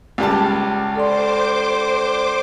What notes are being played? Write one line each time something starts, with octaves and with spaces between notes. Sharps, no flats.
C#2 G3 A5
A4 C5 D5 C6 D6